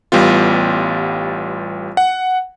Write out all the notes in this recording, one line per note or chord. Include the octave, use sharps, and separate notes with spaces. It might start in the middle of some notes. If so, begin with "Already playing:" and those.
A1 G3 B3 F4
F#5